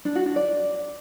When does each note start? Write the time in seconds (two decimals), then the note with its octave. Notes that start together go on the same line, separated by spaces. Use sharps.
0.05 D4
0.15 F#4
0.26 D4
0.36 D5